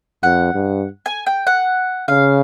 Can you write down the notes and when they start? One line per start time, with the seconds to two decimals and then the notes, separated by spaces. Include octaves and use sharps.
0.23 F2 F#5
0.54 G2
1.06 G#5
1.26 G5
1.47 F#5
2.08 C#3 F5